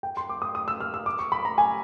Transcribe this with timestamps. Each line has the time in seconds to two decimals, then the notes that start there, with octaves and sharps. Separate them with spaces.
0.03 G5
0.17 C6
0.29 D6
0.42 D#6
0.55 D#6
0.68 E6
0.80 F6
0.94 E6
1.06 D6
1.19 C#6
1.32 B5
1.45 A#5
1.58 G#5